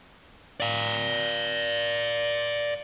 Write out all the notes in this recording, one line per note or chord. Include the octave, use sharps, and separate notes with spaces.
D5 F5